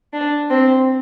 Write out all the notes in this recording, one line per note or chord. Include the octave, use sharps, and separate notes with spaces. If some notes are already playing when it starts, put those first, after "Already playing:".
D4
C4